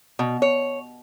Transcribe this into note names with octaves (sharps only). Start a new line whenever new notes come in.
B2
C#5